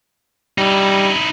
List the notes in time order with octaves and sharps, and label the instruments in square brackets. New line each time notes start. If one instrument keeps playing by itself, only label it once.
[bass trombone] G3 [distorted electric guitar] D#4 E4